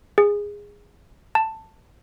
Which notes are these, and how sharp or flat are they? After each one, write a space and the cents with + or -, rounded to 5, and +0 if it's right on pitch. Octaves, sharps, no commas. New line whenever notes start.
G#4 -15
A5 +10